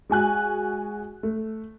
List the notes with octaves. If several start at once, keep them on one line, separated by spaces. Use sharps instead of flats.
G#3 F#4 G#5 F#6
A3